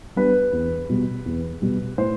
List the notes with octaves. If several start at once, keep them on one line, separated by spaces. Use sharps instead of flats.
G3 B3 D4 B4
E2
B2 G3
E2
B2 G3
A2 C5